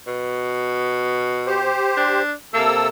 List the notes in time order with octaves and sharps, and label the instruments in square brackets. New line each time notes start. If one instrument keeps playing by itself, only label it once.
[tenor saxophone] B2
[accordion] G4 C5
[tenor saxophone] D4
[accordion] C3 A4 E6 [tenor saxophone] A#3